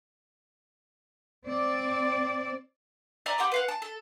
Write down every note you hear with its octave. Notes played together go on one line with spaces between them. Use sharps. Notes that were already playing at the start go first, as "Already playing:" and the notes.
C4 D5
D5 E5 G#5 A#5
G4 F#5 C6 D6
B4 F5 F#5
A5
A4